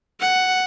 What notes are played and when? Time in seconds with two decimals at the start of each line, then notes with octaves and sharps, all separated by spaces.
0.20 F#5